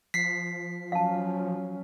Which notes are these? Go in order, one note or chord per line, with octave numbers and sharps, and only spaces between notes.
F3 B6 C7
F#3 C#4 F5 A5